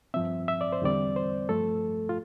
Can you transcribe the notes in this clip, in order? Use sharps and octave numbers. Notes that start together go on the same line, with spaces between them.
G2 F3 C4 E5
E5
D5
C5
E2 D3 G3 C4 D5
C5
G2 F3 A3 A4
F4